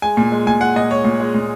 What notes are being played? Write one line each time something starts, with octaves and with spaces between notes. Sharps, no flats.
G#3 G#5
A#2
G#3
A#2 G#5
G#3 F#5
A#2 D#5
G#3 C#5
A#2
G#3
A#2